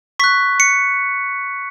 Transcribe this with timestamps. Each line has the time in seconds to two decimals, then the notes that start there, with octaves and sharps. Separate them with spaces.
0.19 C#6 F#6 B6
0.60 C#7